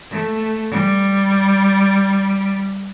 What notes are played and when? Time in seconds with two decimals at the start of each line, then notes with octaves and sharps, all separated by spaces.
0.10 A3
0.71 G3